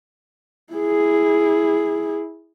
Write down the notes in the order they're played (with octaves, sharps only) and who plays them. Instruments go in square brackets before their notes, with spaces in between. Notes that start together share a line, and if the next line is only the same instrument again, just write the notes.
[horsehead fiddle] E4 G#4